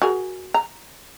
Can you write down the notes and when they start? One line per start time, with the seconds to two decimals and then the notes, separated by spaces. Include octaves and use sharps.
0.02 F#4 G#4 A#4
0.54 A#5